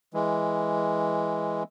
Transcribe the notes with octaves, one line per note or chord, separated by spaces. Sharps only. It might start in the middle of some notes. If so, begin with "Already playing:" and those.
E3 G#3